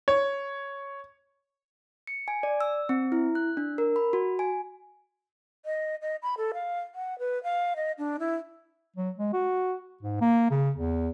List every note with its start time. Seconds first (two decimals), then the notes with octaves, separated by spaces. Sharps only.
0.08 C#5
2.07 C#7
2.28 G#5
2.43 D5
2.61 E6
2.89 C4
3.12 E4
3.35 F#6
3.57 D4
3.78 A#4
3.96 B5
4.13 F#4
4.39 G#5
5.66 D#5
6.02 D#5
6.23 B5
6.38 A4
6.54 F5
6.95 F#5
7.19 B4
7.43 F5
7.76 D#5
7.98 D4
8.20 E4
8.96 F#3
9.18 G#3
9.33 F#4
10.03 G#2
10.21 A#3
10.51 C#3
10.76 E2